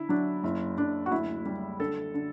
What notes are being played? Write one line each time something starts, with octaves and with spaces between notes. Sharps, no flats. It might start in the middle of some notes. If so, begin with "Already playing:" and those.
Already playing: D3 E4
F#3 D4
F#1 E4
F#1 D4
F#4
D2 E4
G3
D3 A4
D3